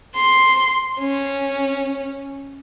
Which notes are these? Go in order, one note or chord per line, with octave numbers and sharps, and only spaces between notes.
C6
C#4